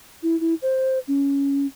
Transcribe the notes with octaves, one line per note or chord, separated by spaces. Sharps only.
E4
E4
C5
C#4